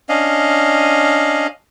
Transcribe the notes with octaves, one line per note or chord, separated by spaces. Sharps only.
C#4 D4 D#5 F5